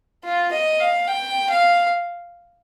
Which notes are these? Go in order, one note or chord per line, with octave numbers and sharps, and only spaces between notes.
F4
D#5
F5
G5
F5